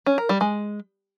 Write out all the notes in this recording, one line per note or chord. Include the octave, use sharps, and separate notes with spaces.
C#4
A#4
G3
G#3